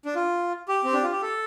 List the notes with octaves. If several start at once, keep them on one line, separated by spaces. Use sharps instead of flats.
D4
F4
G4
C4
D4
F4
G4
A4